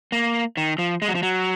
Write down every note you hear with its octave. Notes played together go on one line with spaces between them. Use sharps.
A#3
D#3
F3
G#3
F#3
F3
F#3